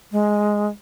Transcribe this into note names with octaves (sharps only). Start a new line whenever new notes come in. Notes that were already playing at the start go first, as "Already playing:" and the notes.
G#3